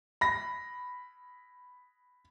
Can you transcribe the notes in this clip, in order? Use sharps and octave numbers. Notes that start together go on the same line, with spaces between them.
B5 A#6